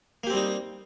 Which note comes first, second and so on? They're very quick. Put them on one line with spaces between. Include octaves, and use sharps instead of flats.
A#3 G4 C4 G3 D#4